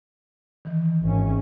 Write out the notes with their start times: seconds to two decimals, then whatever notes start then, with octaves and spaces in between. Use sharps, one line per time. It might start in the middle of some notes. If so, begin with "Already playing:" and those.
0.65 D#3 E3
1.04 G#1 C#4